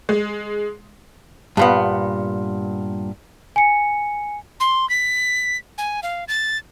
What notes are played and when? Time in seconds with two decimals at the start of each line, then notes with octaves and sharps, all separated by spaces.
0.09 G#3
1.57 G2 A#2 B3
3.56 G#5 C#7
4.60 C6
4.90 B6
5.78 G#5
6.03 F5
6.28 A6